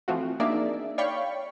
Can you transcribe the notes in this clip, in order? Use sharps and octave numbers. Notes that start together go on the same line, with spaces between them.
E3 F3 A3 C4 F4 F#4
A#3 D4 D#4 G#4 D5 E5
C#5 D5 F5 G5 B5 C#6